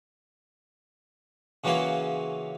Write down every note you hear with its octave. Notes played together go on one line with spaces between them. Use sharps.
C#3 E3 F#3 A#3 C#4 F4